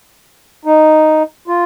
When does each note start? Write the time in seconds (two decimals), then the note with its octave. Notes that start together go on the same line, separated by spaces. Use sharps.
0.65 D#4
1.48 F4